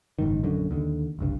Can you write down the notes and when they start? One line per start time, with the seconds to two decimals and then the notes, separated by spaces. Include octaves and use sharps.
0.19 F#1 G#2 D#3
0.43 A#1 F#2 D3
0.71 D#2 D3
1.19 F#1 C2 G2